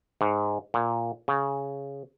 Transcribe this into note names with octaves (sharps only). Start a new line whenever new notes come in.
G#2
A#2
C#3